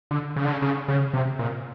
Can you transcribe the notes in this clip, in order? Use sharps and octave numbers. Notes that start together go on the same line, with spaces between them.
D3
C#3
D3
C#3
C#3
C#3
C3
A#2